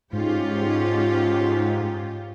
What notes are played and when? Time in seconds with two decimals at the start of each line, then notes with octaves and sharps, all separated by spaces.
0.13 G#2 C#4 F4 G4